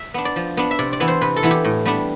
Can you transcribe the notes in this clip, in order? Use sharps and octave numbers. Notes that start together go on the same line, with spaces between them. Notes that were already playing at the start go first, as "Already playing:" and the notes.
Already playing: E5
B3 D4
D5
F3
B3 D4
E5
C3 D5
D5
E3 B3 E4
C5
C3 B4
A4
E3 B3 E4
G4
A2
G3 B3 D4